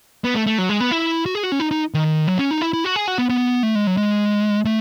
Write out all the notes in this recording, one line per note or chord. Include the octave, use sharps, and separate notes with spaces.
B3
A3
A3
F#3
G#3
B3
E4
F#4
G#4
F#4
C#4
D#4
D#4
D#3
F#3
C#4
D#4
E4
E4
F#4
G#4
F#4
B3
B3
A3
G#3
F#3
G#3
A3